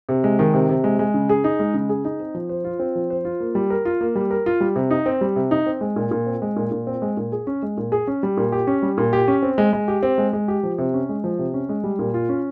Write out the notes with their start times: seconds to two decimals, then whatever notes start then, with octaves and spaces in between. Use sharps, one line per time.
0.09 C3
0.24 G#3
0.39 D#3
0.54 C3
0.69 C3
0.84 G#3
0.99 G#3
1.14 C#3
1.29 G#4
1.44 D#4
1.59 G#3
1.74 C#3
1.89 G#4
2.05 D#4
2.20 C4
2.35 F3
2.49 C5
2.64 F4
2.79 C4
2.95 F3
3.10 C5
3.25 F4
3.40 A#3
3.55 G3
3.70 A#4
3.85 F4
4.01 A#3
4.15 G3
4.31 A#4
4.46 F4
4.60 G3
4.76 C3
4.91 D#4
5.06 C4
5.21 G3
5.36 C3
5.51 D#4
5.67 C4
5.81 G#3
5.96 A#2
6.11 A#2
6.27 C4
6.42 G#3
6.56 A#2
6.72 A#2
6.87 C4
7.02 G#3
7.17 A#2
7.32 G#4
7.47 C#4
7.62 G#3
7.77 A#2
7.92 G#4
8.07 C#4
8.23 G3
8.37 A#2
8.52 G4
8.67 C#4
8.82 G3
8.98 A#2
9.13 G4
9.28 C#4
9.43 C4
9.58 G#3
9.73 G#3
9.88 G4
10.03 C4
10.18 G#3
10.33 G#3
10.48 G4
10.63 F3
10.78 C3
10.94 C#4
11.09 G#3
11.24 F3
11.38 C3
11.54 C#4
11.69 G#3
11.84 G3
11.99 A#2
12.14 F4
12.29 C#4